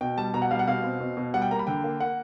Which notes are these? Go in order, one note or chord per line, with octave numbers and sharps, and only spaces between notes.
B2 G5
G3 A5
B2 A#5
F#5
G3 F5
F#5
B2 F5
C4
B2
B2
G3 F#5
G5
A#3 A#5
B5
D3 G5
A#3
A#3 F#5